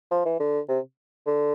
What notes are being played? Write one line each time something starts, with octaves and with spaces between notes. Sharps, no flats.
F3
E3
D3
C3
D3